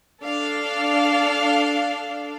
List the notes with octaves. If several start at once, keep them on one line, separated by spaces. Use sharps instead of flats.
D4 A4 F5